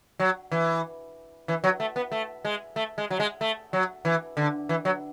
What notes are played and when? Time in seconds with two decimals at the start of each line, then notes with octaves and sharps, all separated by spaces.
0.20 F#3
0.52 E3
1.48 E3
1.64 F#3
1.80 A3
1.96 B3
2.12 A3
2.45 G#3
2.76 A3
2.98 G#3
3.10 F#3
3.20 G#3
3.41 A3
3.73 F#3
4.05 E3
4.37 D3
4.69 E3
4.85 F#3